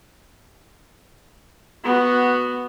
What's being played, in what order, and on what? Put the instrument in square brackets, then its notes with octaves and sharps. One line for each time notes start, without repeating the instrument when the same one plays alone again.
[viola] B3 F#4